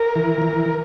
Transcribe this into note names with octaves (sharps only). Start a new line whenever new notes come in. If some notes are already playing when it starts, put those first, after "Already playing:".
Already playing: A#4
E3
E3